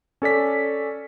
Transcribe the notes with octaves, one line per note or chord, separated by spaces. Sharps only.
C#4 A4 D5 B6